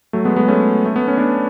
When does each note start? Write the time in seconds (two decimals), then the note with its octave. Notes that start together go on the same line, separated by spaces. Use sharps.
0.13 F#3 A3
0.25 G#3 B3
0.36 G#3 B3
0.48 A3 C#4
0.86 A3
0.96 B3
1.08 C#4
1.17 B3 D4